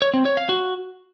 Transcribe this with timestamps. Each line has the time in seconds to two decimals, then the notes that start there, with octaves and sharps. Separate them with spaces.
0.02 C#5
0.14 C4
0.25 C#5
0.37 F5
0.49 F#4